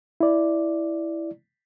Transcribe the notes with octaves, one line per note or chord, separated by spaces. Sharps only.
E4 D5